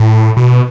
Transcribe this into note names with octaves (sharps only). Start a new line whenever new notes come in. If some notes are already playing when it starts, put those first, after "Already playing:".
Already playing: A2
B2